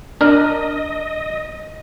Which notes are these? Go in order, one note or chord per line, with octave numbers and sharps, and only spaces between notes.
D4 A#4 D#5